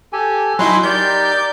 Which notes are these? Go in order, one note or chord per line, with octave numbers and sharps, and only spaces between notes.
G4 A4 G#5
F#3 D#4 E4 G#5 B5 C6 F#6
D#4 G4 A#4 D5 G6